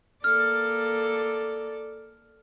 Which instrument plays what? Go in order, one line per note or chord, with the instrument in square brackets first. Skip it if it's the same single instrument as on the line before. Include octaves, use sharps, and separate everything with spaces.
[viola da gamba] A#3 A4 D5 [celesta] F6